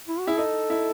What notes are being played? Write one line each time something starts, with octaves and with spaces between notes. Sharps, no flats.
E4
F#4
E4 G#4
D#4 A4
E4